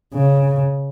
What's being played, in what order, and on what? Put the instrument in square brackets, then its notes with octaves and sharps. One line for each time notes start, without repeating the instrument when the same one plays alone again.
[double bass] C#3